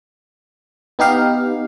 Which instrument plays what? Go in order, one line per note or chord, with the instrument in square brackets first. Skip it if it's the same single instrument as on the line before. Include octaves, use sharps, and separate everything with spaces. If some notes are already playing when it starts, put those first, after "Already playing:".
[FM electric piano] B3 D#4 G4 F5